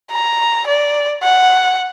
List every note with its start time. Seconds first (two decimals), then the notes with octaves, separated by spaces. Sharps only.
0.12 A#5
0.67 D5
1.23 F#5